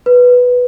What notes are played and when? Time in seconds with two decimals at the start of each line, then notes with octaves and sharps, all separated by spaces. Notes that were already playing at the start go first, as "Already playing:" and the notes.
0.06 B4